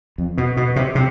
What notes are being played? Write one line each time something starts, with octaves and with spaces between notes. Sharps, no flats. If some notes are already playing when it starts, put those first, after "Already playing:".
F2
B2
B2
C3
C3